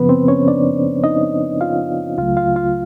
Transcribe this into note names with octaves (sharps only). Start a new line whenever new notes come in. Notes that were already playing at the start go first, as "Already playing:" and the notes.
Already playing: F#2 C#3 F3 B3 B4
C4 C5
C#4 C#5
D4 D5
D#4 D#5
F4 F5
C#2 C#3 F#3 A3 F4 F5
F4 F5
F4 F5